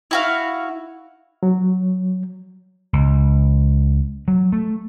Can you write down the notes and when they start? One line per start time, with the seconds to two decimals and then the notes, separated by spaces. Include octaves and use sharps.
0.11 E4 F#4 F5
1.43 F#3
2.93 C#2
4.28 F#3
4.53 A3